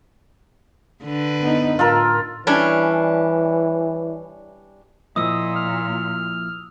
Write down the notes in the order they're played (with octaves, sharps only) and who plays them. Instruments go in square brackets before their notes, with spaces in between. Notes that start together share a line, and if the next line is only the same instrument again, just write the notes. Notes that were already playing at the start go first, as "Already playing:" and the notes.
[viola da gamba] D3 B4
[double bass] B3 D#4
[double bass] A2 [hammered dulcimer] F4 A4 A#4
[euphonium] E3 [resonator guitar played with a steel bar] G3 C#4 D4
[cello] A#2 [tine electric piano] F3 A#3 E4 [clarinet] D#5 [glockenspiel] D#6 E6
[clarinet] F6